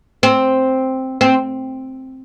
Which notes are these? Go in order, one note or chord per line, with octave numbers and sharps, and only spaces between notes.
C4
C4